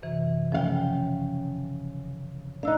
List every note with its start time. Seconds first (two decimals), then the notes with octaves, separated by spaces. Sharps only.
0.02 F#2 C3 E3
0.52 C#3 F3 F5 G5
2.63 D4 D#4 F5 E6 F#6